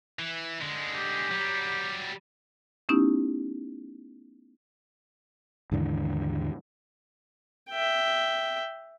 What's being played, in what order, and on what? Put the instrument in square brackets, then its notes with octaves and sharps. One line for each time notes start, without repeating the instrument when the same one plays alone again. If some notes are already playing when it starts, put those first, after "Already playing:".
[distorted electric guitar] E3
D3 G#3
[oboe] G4
[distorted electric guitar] F#3 G3
[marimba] A3 B3 C#4 D#4 E4 G4
[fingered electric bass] D#2 G#2 D3 E3
[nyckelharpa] E5 G5